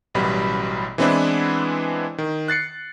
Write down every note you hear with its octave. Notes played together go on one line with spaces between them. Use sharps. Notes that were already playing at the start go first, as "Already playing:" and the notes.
A1 F#2 B2 G3 B5
E3 G#3 B3 C4 D4 E4
D#3
F#6 A6 C7 C#7